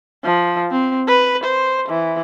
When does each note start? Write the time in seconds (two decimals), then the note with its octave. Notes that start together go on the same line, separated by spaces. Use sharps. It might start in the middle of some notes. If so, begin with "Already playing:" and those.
0.25 F3
0.71 C4
1.08 B4
1.44 C5
1.89 E3